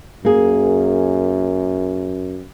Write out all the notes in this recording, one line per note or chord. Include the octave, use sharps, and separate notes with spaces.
F#2 A#3 G#4